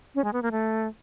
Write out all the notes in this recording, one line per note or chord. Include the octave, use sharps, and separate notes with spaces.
C#4
G#3
B3
A#3
A3